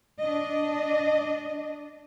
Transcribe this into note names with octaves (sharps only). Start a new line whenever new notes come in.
D4 D#5